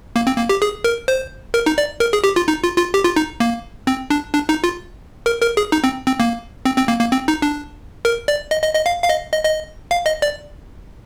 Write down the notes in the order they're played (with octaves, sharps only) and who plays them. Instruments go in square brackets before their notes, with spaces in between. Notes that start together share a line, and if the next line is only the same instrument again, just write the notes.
[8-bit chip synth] A#3
C4
A#3
G4
G#4
A#4
C5
A#4
D#4
D5
A#4
G#4
G4
F4
D#4
F4
F4
G4
F4
D#4
A#3
C4
D4
D4
D#4
F4
A#4
A#4
G#4
D#4
C4
C4
A#3
C4
C4
A#3
A#3
C4
D#4
D4
A#4
D5
D#5
D#5
D#5
F5
F5
D#5
D#5
D#5
F5
D#5
D5